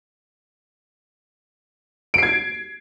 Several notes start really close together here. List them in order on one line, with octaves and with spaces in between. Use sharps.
D7 C7 G#6